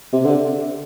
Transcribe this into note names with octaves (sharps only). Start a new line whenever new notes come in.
C3
D3